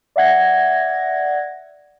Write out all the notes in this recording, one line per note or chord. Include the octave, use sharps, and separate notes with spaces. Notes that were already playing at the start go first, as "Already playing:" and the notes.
D5 E5 F#5 G#6 A#6